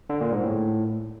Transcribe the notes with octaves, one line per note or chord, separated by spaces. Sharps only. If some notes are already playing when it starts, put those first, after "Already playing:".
D3
A#2
G#2
A2